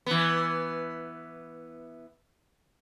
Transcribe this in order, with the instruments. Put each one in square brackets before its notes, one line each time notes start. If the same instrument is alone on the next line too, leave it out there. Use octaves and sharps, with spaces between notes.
[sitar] E3 B3